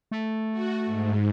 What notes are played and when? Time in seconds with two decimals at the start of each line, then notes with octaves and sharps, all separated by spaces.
0.11 A3
0.52 F#4
0.86 G#2